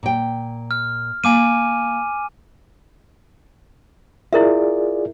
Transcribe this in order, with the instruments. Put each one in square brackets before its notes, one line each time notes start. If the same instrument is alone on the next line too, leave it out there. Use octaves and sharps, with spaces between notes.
[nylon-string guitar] A#2 G5
[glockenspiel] F6
[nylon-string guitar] A#3 [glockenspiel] G#5 D6 D#7
[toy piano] E4 A#4 E5 [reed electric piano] F4 G#4 D5